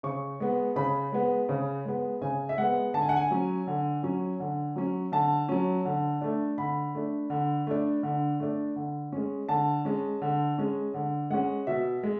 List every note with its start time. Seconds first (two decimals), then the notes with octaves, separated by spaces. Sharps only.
0.03 C#3 C#6
0.40 G#3 B3
0.76 C#3 B5
1.12 G#3 B3
1.49 C#3
1.85 G#3 B3
2.22 C#3 G#5
2.49 E5
2.58 G#3 B3 F#5
2.94 D3 A5
3.02 G#5
3.09 F#5
3.17 G#5
3.31 F#3 C#4
3.67 D3
4.03 F#3 C#4
4.40 D3
4.76 F#3 C#4
5.12 D3 A5
5.49 F#3 C#4
5.85 D3
6.21 A3 D4
6.58 D3 B5
6.95 A3 D4
7.30 D3
7.67 A3 D4
8.03 D3
8.40 A3 D4
8.76 D3
9.12 G#3 C#4
9.49 D3 A5
9.85 G#3 C#4
10.22 D3
10.58 G#3 C#4
10.94 D3
11.30 G#3 C#4 F#5
11.67 B2 E5
12.03 G#3